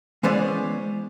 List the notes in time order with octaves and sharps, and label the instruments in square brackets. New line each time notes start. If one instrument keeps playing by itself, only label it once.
[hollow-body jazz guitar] E3 G#3 B3 C#4 C5 D5